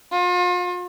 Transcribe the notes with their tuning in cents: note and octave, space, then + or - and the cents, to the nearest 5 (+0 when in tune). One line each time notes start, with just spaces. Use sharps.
F4 +40